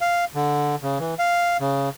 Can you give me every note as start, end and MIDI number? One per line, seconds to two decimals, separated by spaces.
0.01 0.25 77
0.35 0.76 50
0.82 0.98 49
0.99 1.14 52
1.19 1.57 77
1.60 1.89 49